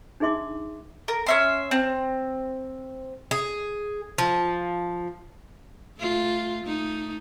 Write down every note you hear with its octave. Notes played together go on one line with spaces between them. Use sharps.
D4 D#4 G#4 E5 C6 D6
A#4
C#4 E5 C6
C4
G#4
F3
A3 F4
A3 D#4